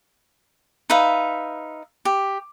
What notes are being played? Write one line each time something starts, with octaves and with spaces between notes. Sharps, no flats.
D#4 B4 E5 F5
G4